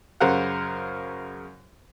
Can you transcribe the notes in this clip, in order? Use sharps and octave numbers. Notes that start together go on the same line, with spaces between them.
F#2 C#3 A#4 C5 F5 F#5